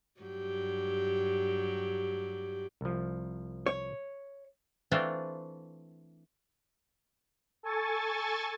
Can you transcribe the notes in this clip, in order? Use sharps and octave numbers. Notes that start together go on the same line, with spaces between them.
G2 F#3 G4
C2 F3
C#5
E3 A3 C4 D4 F4
A4 G#5 C#6 A6